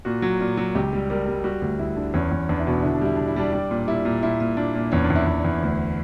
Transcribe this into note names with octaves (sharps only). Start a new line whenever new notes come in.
A#2 F#4
F#3
A#2
F#3
C#2 G4
G3
G3 A#4
G3
G3 F#4
D2
D2 E4
D3
E2 C#4
E2
E2 D4
E4
B2 D4
D3 E4
D4
G3 E4
D3 D4
E4
G3 D4
G3 D4
A#2
G3 E4
A#2
A#2 E4
A#2
A#2 D4
A#2
E2 C#4
D4
E2
E4
E2
E2
D2